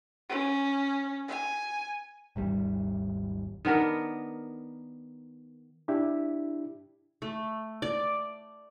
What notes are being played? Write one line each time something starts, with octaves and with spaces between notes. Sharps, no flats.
C#4
G#5
G#1 D#2 G3
D#3 B3 D4 A#4
D4 E4 G4 E5
A3
D5